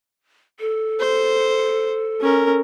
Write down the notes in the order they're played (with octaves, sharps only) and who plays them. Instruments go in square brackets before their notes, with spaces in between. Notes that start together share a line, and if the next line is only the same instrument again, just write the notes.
[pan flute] A4
[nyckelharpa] C5
C#4 A#4